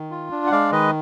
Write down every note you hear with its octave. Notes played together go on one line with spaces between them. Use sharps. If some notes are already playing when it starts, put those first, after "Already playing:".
Already playing: D#3
F4
D4
F#5
G#3 D5 F5
D#3 B4 D#5